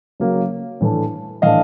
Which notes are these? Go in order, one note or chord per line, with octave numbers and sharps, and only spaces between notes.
C#3 F#3 A#3
A2 E3 A3 D4
A2 E3 A3 D4 D#5 F5